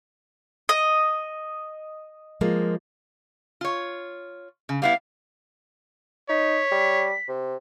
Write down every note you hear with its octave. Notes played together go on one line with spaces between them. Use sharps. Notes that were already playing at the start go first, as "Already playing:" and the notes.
D#5
F3 G#3 A#3
F4 C#5
C#3
G3 B3 E4 F5
D#4 C#5 B6
G3
C3